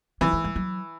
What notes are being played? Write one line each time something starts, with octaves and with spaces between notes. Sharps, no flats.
E3 C#4
A3
G#3
F#3